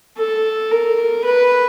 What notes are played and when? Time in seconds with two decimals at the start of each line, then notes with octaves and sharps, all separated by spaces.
0.18 A4
0.71 A#4
1.25 B4